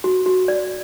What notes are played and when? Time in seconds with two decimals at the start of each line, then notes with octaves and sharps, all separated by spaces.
0.04 F#4
0.26 F#4
0.48 D5